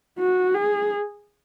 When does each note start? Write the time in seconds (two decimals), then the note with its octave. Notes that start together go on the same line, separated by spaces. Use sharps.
0.19 F#4
0.54 G#4